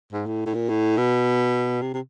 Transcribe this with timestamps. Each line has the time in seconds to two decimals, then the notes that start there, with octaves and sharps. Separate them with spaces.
0.13 G#2
0.26 A2
0.46 A2
0.54 A#2
0.69 A2
0.97 B2
1.82 C3
1.94 C3